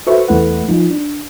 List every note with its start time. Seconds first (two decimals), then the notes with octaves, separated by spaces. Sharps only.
0.07 F#4 A4 B4 C5 E5 C#6
0.28 E2 A3 E4 B4 F#5
0.68 F3 D#4 F4
0.91 D4